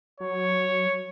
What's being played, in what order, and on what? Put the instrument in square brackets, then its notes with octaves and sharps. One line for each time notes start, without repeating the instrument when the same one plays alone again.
[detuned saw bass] F#3 [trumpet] C#5